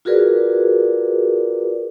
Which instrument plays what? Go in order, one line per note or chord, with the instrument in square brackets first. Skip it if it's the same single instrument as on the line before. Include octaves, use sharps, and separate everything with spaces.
[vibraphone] F4 F#4 G#4 A#4 B4 D5